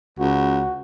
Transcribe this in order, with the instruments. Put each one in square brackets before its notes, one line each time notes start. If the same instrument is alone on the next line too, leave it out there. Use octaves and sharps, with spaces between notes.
[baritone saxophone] C#2 [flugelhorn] F#4